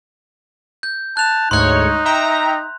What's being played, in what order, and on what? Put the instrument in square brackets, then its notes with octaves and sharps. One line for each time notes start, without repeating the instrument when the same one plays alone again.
[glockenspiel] G6
[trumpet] A5 [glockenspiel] F#6 F7
[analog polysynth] D2 G#2 C#5 [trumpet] D#4 [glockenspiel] C6 F#6
[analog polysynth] E5 G5 A#5